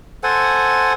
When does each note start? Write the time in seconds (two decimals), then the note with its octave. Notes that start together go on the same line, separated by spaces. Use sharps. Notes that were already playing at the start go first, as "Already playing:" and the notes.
0.23 A4 C5 F#5 G#5